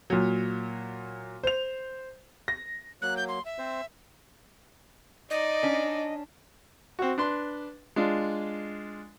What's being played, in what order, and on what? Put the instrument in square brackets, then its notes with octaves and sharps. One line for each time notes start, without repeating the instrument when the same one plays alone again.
[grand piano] A#2 F#3
C5 F7
A#6
[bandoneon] F#3 A#3 [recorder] F#6
[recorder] G6
C6
E5
[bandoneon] C4 C5
[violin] D#4 D5 [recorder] D#5
[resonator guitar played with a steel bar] C#4 D4
[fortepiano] C4 F#4
D4 B4 C6
G#3 D4 F4